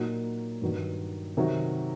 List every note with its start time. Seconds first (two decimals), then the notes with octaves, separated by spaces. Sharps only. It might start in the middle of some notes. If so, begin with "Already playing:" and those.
Already playing: A#2 F#3 A#3 D#4
0.62 G2 D#3 F#3
1.37 C3 D#3 F#3